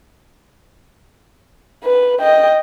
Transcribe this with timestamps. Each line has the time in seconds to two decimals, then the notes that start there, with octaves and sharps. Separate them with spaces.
1.84 B4
2.20 D#5 G5